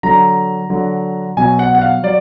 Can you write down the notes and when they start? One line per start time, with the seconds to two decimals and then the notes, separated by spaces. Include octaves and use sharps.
0.03 D3 F#3 A#5
0.70 D3 F#3
1.37 B2 F#3 G#5
1.59 F#5
1.75 F#5
1.82 F5
2.03 F#3 D5